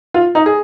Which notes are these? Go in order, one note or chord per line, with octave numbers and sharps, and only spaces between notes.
F4
D#4
G#4